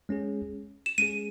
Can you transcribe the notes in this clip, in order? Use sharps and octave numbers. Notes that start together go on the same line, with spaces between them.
G#3 C#4 G#4
E7
G#3 C#4 G#4 D#7